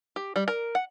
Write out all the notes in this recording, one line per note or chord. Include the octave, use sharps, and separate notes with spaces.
G4
G3
A#4
F#5